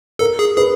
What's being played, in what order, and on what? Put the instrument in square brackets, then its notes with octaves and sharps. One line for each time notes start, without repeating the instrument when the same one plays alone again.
[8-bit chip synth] A4 [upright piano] A#4
[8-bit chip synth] G#4
[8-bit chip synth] G#4 [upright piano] B4